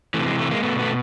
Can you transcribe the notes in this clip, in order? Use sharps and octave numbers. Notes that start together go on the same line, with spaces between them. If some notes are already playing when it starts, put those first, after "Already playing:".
C3 E3 A3
G#3
A3
G#3 A#3
B2 A3 B3
A3 B3